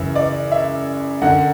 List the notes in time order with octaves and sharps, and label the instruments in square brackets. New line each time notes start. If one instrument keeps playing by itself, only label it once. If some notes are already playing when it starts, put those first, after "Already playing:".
Already playing: [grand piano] F#2 C#3 E3 E5
D5
E5
F#2 D3 F#5